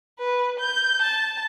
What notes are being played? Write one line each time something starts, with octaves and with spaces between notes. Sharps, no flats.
B4
G6
A5